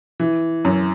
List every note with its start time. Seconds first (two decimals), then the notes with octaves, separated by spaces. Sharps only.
0.20 E3
0.65 F#2